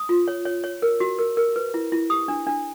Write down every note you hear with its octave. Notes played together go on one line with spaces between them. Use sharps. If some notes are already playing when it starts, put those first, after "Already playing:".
Already playing: D#6
F4
C#5
C#5
C#5
A#4
F#4
A#4
A#4
B4
E4
E4
G4 D#6
D4
D4